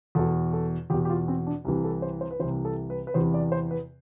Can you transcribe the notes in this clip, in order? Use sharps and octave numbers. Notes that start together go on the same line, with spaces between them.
E2 B2 A4
A4
E2 B2 G4
G4
F4
C4
D4
C2 C3 E3
A4
C5
C5
B4
C2 C3 E3 C5
A4
B4
B4
E2 C3 E3 C5
D5
C5
B4